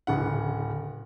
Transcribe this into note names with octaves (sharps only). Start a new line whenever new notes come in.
D1 C#3 F#5